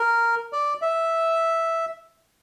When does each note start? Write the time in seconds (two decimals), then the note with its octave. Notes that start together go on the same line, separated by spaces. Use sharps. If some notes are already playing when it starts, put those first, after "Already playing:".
Already playing: A#4
0.53 D5
0.82 E5